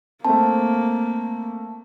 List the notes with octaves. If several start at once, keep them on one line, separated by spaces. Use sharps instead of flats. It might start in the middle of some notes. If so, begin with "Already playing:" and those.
A3 A#3 C4 A5